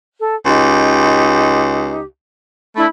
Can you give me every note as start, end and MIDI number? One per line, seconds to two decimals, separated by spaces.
0.19 0.35 69
0.45 2.04 37
0.45 2.02 63
0.45 2.02 67
2.76 2.85 57
2.76 2.86 62
2.76 2.86 64
2.76 2.86 83